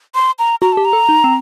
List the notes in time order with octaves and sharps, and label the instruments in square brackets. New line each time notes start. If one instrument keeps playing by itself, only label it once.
[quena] C6
A#5
[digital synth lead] F#4 [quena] A#5
[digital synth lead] G4 [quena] A5
[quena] A#5
[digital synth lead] A4
D#4
C4